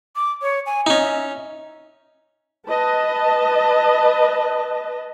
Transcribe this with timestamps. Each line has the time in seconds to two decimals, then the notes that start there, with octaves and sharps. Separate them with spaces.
0.16 D6
0.42 C#5
0.66 G#5
0.86 C#4 D#4 D#5
1.01 E5
2.66 B4 D#5 A5